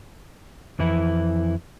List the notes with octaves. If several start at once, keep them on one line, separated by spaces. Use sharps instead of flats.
F2 E3 E4